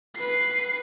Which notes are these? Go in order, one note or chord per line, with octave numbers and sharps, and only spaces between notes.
B4 C7